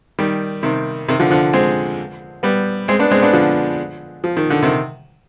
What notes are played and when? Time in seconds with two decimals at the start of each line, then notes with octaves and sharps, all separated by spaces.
0.19 D#3 G3
0.63 C3 D#3
1.08 C3 D#3
1.19 D3 F3
1.30 D3 F3
1.53 G#3 C4
2.43 G3 B3
2.88 G#3 C4
2.99 B3 D4
3.11 G#3 C4
3.22 B3 D4
3.33 D3 F3
4.24 F3
4.37 D#3
4.50 D3
4.62 C3 D#3